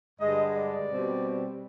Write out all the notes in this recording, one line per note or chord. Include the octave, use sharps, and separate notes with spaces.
G2 D3 G#3 D#5
D5
B2 G3 C4